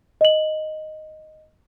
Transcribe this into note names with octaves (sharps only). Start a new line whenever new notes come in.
D#5 F#7